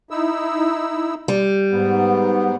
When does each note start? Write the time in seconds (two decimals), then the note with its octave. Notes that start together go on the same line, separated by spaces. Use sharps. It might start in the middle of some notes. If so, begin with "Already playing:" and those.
0.11 D#4 E4 E6
1.28 G3
1.72 G#2 B3